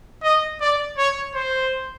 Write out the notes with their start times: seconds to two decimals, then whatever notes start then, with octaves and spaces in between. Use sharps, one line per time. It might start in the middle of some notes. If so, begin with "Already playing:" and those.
0.23 D#5
0.61 D5
0.98 C#5
1.35 C5